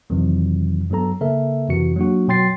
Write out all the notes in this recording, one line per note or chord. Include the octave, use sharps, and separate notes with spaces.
F2 C3 D#3 E3 F#3
G2 F#3 B3 A4 A#5
C#3 A#3 A4 A#4 E5
F2 C3 E3 F#4 C#7
F#3 A#3 D4 F#4
B2 F#3 G5 C6 A6 C7